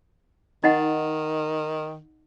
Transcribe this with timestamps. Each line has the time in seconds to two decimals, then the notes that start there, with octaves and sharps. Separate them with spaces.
0.64 D#3 D#4 D#5 F#5